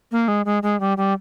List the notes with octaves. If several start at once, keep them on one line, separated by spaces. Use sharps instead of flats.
A#3
G#3
G#3
G#3
G3
G3